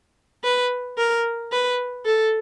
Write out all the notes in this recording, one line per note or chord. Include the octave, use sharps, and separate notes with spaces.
B4
A#4
B4
A4